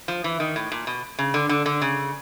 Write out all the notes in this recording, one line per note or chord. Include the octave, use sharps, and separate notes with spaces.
F3
E3
D#3
A2
A#2
B2
C#3
D3
D3
D3
C#3